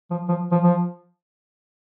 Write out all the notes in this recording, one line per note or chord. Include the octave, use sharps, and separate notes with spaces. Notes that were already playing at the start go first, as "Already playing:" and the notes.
F3
F3
F3
F3